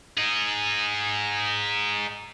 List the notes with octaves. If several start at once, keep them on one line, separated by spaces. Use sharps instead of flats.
D#4 G#4